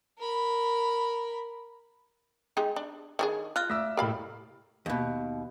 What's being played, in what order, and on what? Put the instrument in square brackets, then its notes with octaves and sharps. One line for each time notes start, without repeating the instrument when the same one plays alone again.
[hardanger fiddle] A#4 B5
[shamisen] G#3 D#4 G4
D4
D#3 D4 G#4
[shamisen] F4 [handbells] F5 F6 F#6
[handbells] A3 [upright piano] E5 D6 E6
[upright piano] A2 G4 F6 [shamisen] A#4 F5 B5
[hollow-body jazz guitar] D#2 B2